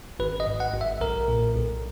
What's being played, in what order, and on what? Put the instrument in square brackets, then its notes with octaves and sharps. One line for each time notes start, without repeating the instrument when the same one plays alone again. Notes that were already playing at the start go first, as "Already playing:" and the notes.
[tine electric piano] G#1 B4
D#5
G#2
F#5
G#1
E5
B1 A#4
A#2
B1